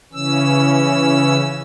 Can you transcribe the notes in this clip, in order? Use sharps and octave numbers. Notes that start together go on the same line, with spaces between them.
C#3 E3 C#4 E6